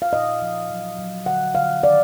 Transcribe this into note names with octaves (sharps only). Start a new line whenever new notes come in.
F5
A#2 D#5
F3
F#3
F#3
D3 F#5
D3 F5
D#3 D5